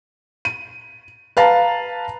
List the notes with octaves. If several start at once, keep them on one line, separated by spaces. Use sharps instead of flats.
D#7
B4 F5 A5 A#5